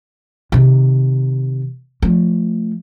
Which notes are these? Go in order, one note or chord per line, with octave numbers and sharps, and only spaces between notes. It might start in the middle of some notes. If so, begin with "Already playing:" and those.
C3 D#3
F3 A3